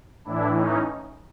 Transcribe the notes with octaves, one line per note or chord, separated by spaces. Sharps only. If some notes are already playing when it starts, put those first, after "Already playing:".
A2 E3 D4 E4
C#4 D#4